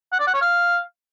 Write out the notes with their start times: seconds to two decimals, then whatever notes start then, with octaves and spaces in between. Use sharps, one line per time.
0.12 F#5
0.20 D5
0.27 F#5
0.34 C#5
0.41 F5